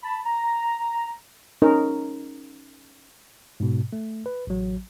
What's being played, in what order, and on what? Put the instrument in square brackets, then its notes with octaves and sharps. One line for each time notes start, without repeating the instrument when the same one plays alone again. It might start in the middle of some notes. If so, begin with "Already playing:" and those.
[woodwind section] A5 B5
A#5
[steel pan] C#4 D#4 A#4
[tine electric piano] G#2 B2
A3
B4
A1 F#3